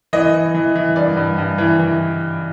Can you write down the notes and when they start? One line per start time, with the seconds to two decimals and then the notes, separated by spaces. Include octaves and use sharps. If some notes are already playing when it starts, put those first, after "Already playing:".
0.13 E3 D#5
0.34 E3
0.55 E3
0.76 E3
0.96 G2 D5
1.17 G2
1.38 G2
1.58 E3
1.79 E3